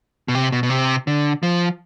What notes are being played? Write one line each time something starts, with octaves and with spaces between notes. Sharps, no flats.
B2
C3
B2
B2
C3
D3
F3